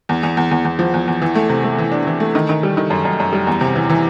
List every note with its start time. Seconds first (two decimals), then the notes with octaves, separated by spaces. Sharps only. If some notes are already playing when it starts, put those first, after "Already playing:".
0.09 E2
0.23 E2
0.37 E2
0.51 E2
0.65 E2
0.79 F3
0.94 E2
1.08 E2
1.22 E3
1.35 A3
1.49 C3
1.64 A3
1.78 E3
1.92 D4
2.07 E3
2.20 A3
2.35 D#3
2.49 D#3
2.63 G3
2.77 D#3
2.90 F#2
3.05 F#2
3.20 F#2
3.33 G3
3.47 E2
3.61 C3
3.75 E3
3.90 E3